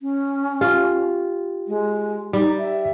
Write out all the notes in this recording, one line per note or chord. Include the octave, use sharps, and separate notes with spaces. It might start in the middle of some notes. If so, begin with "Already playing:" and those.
C#4
F4 G4
G#3
G3 D#4
E5